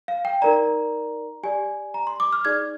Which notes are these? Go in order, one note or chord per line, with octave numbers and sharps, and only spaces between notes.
F5
G5
D#4 A#4 D5 A#5
G4 D5 G#5
A#5
C6
D6
F6
D#4 G#4 D5 G#6